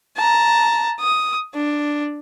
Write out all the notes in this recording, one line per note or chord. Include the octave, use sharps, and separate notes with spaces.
A5 A#5
D#6
D4